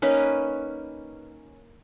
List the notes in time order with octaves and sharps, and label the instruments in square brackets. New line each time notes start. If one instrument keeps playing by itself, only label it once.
[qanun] A#3 C#4 D#4 B4